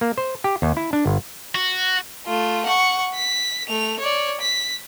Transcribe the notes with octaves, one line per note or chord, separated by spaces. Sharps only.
A#3
C5
G4
D#2
E4
D4
G1
F#4
A3 F4
F#5 C#6
B6
A3 F7
C#5 D5
B6